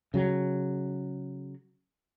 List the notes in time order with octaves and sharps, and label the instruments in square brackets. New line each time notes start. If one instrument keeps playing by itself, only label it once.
[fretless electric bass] C#3 F#3